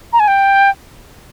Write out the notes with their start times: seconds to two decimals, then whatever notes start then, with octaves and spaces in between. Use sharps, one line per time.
0.13 A#5
0.20 G#5
0.28 G5